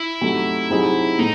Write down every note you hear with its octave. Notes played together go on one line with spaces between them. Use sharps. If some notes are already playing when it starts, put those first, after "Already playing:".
Already playing: E4
C3 F#3 A3 D#4
C3 F#3 C4 D#4 G#4
A2 D#4